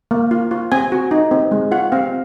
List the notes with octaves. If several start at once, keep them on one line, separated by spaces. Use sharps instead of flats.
A#3
F4
F4
C4 G#5
F#4
D#4
C4
G#3
F4 F#5
C4 F5